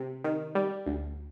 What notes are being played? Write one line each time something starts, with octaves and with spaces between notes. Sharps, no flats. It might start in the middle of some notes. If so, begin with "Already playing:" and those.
Already playing: C3
D#3
G3
D2